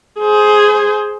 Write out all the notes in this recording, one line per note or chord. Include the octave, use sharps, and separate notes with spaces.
G#4 C5